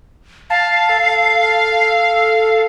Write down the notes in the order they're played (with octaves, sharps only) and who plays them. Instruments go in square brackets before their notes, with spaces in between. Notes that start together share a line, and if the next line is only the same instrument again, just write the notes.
[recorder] F5 [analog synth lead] A5
[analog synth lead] A4